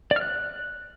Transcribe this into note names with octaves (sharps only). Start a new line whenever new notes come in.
D5
F6
F#6